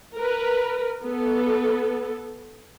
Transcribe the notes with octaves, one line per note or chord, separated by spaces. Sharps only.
A#4 B4
B3 A4